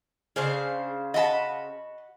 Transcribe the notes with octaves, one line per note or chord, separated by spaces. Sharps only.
C#3 D4 G#4 C5 F5
F#4 D#5 A5 B5